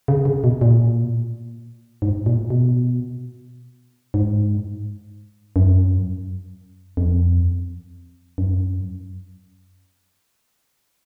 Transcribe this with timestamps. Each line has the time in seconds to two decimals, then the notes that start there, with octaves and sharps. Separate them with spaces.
0.08 C#3
0.25 C#3
0.44 B2
0.61 A#2
2.02 G#2
2.26 A#2
2.50 B2
4.14 G#2
5.56 F#2
6.97 F2
8.38 F#2